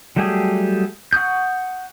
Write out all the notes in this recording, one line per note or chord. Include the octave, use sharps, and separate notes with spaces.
F#3 G3 A3 G4 G#4
F#5 C#6 D#6 G6